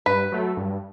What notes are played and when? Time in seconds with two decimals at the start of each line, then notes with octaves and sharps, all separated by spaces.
0.06 G2 B4
0.32 F#3 A3
0.57 G2